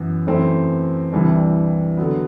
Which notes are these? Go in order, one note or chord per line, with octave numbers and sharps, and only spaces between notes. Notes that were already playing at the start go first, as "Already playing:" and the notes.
Already playing: F#2 E3 B3
F#2 E3 A3 C4
C2 C3 E3 G3 D4
D3 F#3 B3